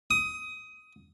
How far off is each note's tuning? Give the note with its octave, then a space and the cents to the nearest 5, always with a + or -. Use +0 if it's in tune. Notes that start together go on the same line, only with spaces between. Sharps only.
D#6 +20